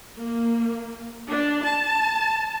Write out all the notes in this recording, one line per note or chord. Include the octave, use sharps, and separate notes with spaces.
A#3
D4
A5